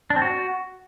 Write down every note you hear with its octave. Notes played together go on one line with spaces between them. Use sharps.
D4
C4
F#4